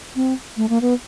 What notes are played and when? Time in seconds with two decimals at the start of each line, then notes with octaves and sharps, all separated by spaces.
0.16 C4
0.57 A3
0.69 A#3
0.81 B3